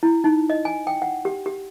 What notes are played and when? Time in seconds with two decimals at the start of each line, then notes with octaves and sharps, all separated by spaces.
0.03 E4
0.24 D#4
0.50 D#5
0.65 G#5
0.87 G5
1.02 F#5
1.25 G4
1.46 G4